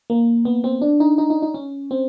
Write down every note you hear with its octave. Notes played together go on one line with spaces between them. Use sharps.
A#3
B3
C4
D4
D#4
D#4
D#4
D#4
C#4
C4